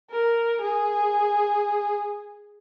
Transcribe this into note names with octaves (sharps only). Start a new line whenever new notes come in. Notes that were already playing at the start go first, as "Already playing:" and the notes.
A#4
G#4